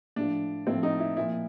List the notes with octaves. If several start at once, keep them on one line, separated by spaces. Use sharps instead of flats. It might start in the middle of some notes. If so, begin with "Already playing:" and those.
A2 F3 D4
A2 F3 C4
D#4
E4
A#2 F3 E4